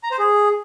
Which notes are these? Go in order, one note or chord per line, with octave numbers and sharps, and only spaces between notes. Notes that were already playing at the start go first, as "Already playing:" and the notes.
A#5
C5
G#4